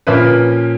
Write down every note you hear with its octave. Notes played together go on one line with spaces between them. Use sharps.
A#2 F3 A#3 C#4 B4